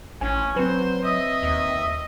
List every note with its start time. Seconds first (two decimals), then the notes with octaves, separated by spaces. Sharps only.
0.21 A1 C#4 G#5
0.56 F#3 C4 B4 C5
1.04 D#5 E5 D#6
1.43 D#2